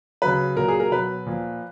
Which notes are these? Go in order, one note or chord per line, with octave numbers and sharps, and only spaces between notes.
C#3 F#3 B4
A#2 F#3 A#4
G#4
A#4
B2 F#3 B4
A#2 F3